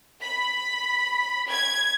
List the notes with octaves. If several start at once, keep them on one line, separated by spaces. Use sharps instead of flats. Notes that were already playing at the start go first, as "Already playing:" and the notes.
B5
G#6